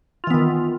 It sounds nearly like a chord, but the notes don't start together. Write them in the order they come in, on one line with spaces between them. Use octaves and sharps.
F4 E3 B3 D#3